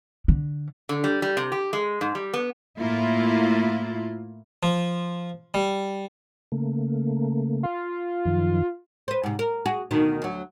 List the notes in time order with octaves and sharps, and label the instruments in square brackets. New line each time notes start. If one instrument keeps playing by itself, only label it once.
[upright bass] D3
[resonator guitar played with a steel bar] D3
G3
G3
C3
G4
G#3
G#2
G3
B3
[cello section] A2 A#3 E4 F4
[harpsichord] F3
G3
[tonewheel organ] C#3 A3 A#3
[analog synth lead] F4
[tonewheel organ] F#2 D#3 F3
[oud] B4 C5
G#2 C3
A#4
F#4 G#4
D2 B2 D#3
D2 F#3